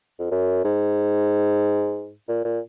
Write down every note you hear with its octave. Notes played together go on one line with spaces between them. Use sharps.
F2
F#2
G#2
A#2
A#2